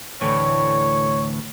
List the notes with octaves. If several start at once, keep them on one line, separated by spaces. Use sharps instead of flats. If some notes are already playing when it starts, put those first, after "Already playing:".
D2 A2 E3 C#5